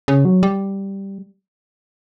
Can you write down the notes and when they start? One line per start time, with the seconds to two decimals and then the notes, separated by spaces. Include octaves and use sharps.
0.08 C#3
0.25 F#3
0.43 G3